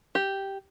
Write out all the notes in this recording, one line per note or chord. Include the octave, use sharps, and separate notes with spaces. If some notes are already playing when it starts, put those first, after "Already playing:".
G4